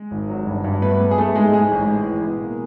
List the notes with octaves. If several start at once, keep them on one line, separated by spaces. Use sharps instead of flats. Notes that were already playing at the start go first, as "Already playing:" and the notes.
Already playing: G#3
G#1
F#3
G2
G2
A3 B3 B4
A3
G#4
A3 A4
G#2 G#3 G#4
G#2 G#3 G#4
A1
E3
E3
B2
A#3